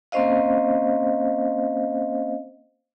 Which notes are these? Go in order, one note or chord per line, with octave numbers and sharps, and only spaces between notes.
A#3 C4 C#4 C5 D#5 F5